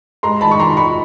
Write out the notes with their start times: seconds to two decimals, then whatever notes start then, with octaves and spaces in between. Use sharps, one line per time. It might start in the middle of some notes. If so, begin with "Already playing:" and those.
0.23 G#3 A#5 C6
0.41 D#3 A5 B5
0.52 C#6
0.59 D#3 A#5 C6
0.77 D#3 B5 C#6